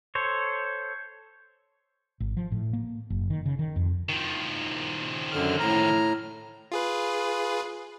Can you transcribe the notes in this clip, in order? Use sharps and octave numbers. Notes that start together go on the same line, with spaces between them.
A4 C5 C#5
G#1
F3
A2
A#3
F#1
D#3
C#3
D#3
F2
D#3 F3
F#2 D3 F6
A2 A#5 F6
F4 G#4 B4